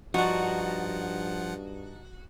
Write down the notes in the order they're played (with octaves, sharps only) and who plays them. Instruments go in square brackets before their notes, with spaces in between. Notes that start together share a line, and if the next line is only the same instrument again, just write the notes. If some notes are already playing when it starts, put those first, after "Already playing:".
[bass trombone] G2 [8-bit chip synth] F3 F#5 [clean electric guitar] D4 D#4 [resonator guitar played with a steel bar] F#4